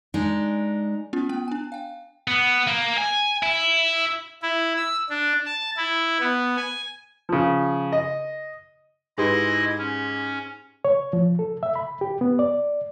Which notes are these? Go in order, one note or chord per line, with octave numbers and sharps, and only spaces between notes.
G#3 D4 D#4
B3 C#4 F4
B3 G5
D4 G#5
F5 G5
B3
A#3
G#5
E4
E4
E6
D4
A5
E4
B3
G#5
C#3 F3
D#5
G#2 D#4 E4 G4 G#4 B4 D#5 C6
C#4
C#5
F3
A4
E5
B5
G4
B3
D5